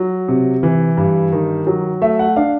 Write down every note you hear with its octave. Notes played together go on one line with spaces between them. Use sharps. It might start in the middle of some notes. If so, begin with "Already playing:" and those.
Already playing: F#3
C3
E3
G2
D#3
F#3
A3 E5
F#5
D4 F5